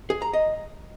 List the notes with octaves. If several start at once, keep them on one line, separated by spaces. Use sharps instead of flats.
G#4
A#5
D#5